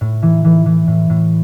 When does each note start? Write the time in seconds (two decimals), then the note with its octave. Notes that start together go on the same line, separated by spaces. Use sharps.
0.01 A2
0.22 E3
0.45 E3
0.66 E3
0.88 A2
1.10 A2